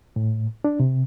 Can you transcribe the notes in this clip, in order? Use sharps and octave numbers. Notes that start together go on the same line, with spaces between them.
A2
D4
C3